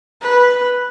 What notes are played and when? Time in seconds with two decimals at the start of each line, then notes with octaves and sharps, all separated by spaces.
0.22 B4